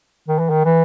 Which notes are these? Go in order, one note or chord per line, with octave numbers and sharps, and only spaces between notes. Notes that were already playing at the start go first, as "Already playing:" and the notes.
D#3
E3
D#3
E3